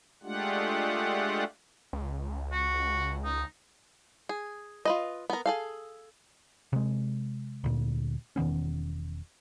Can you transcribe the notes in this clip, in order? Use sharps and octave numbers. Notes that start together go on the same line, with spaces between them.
G#3 A3 D4 F4 G4 F#5
C#2
F#4
D#4
G#4
F4 B4 D#5
B3 A#4
G#4 A4 F5
C3 G#3
D2 A#2
E1 D#3 B3 C#4